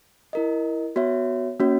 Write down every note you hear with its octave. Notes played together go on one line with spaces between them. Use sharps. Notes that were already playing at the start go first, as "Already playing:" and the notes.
E4 A#4 D#5
B3 F#4 C#5 E5
A#3 C#4 F#4 C#5